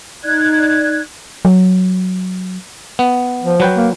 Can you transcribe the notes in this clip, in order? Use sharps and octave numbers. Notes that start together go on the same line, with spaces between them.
D#4 D5 F#6 G#6
F#3
B3
F3
F#3 B4 G5
A#3